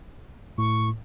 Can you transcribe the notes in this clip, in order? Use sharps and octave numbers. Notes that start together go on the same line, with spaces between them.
A2 C#6